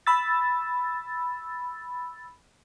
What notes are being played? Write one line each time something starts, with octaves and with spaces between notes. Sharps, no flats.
B5 E6 A6